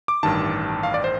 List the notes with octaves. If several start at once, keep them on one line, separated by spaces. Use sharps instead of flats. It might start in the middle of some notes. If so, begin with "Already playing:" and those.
D6
A1 G2 D#3 A5
F5
D5
C5